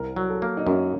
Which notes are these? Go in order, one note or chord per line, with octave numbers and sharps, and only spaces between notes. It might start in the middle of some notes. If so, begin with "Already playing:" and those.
Already playing: C2 A#4
F#3
A4
A#3
D#4
F#2 C#4